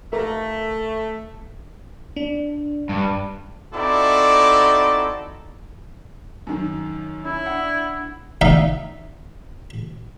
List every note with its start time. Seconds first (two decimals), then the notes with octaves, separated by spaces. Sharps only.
0.13 A3 A#4 A#5
2.16 D4
2.89 G2
3.74 C4 D#4 E4 F#4 A4 D5
6.47 F#2 D#3
7.25 C#4 E4
7.46 D4 F#5
8.41 D#4 E5 F5